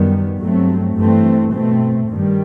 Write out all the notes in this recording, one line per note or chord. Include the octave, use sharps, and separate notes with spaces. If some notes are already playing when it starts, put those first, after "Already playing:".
Already playing: F#2 D#3 G3 B3
G2 F#3 A3 C4
G2 E3 A3 C4
B2 A3 C4
G2 D#3 G3